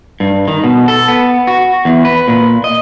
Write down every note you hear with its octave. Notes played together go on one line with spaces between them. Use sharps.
G2
D#3
B2
A4
B3
F#4
E2
B4
A#2
D#5